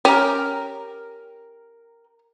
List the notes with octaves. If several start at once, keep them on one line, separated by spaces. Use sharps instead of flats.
C#4 G4 A#4 G5